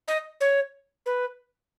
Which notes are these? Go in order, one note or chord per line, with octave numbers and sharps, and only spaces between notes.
D#5
C#5
B4